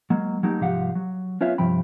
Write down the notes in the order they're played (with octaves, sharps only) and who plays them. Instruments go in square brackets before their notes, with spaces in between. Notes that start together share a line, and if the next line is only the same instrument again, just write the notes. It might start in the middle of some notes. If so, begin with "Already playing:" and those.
[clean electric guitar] F#3 G#3 A#3
F#3 A3 A#3 D#4 G4
C2 G#2 F3 G4 F5 F#5
F#3
B3 C#4 F4 C#5 E5 F5
G2 C3 F3 G5 B5